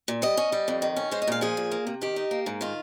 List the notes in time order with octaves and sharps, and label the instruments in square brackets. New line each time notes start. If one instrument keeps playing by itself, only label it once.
[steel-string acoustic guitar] A#2
G3 D#5
C#4
G3
F2
D#3
C#4
G#3 C5
D#5
A#2 F5
F3 G#4
A#2
A#3
C3
D#3 G4
D#4
A#3
G#2
D#3 F4